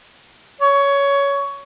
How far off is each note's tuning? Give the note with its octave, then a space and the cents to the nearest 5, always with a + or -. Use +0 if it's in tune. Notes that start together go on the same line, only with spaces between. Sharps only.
C#5 +15